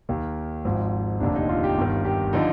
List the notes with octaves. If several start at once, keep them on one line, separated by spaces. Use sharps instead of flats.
D#2 D#3
G#1 G#2 F3
F1 D#2 D3 D4
D#4
F4
G4
G1 G2 D#3
G4
D3 F3 D#4